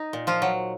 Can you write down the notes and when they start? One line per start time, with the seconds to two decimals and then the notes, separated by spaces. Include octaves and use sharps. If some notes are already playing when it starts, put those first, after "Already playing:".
Already playing: D#4
0.13 A#2
0.27 F3 F4
0.42 F#3